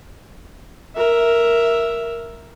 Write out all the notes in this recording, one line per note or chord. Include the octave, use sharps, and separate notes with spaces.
A#4 E5